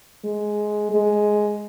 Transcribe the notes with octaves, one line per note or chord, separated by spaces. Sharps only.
G#3
G#3